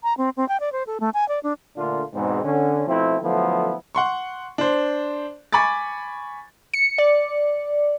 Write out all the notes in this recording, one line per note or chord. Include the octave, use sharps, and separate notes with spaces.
A#5
C4
C4
G5
D5
C5
A4
A3
G#5
D5
D4
A#2 D3 A3 D4 F4
E2 G#2 B2 G#3 C4
D3 C#4
B2 F3 A3 C4 E4
D3 F3 F#3 A3 B3 E4
F#5 C6 C#6
D4 C5
G#5 B5 C#6 D6 A6
C#7
D5